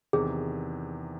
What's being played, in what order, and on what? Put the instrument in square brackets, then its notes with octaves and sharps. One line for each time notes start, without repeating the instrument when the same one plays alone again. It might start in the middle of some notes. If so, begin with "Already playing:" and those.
[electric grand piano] E2 C3 D#3 [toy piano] G#4